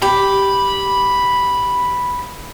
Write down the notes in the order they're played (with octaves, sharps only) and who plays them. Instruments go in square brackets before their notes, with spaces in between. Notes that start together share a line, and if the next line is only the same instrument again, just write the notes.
[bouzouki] G4 [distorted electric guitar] B5